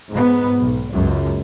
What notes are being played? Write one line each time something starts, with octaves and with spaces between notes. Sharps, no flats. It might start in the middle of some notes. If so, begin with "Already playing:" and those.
G#2 B3
B1
C#2 F#2